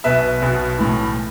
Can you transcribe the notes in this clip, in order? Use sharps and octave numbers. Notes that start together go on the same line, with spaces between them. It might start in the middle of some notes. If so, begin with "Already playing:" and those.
B1 B2 B4 E5
B1 B2
B1 A2 E3